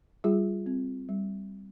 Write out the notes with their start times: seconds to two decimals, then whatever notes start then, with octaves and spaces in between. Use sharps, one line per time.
0.24 G3 F4 G#4
0.66 C4
1.09 G3